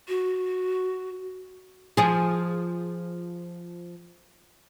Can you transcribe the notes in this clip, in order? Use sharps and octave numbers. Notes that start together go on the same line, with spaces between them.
F#4
F3 G#4